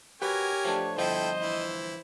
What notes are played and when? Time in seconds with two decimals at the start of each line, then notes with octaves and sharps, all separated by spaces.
0.22 F#4 G4 A#4 B4 C#5 F#5 G#5
0.65 F3 A3 D4
0.98 G1 F3 E4 A4 C5 D#5 G5
1.41 E3 E4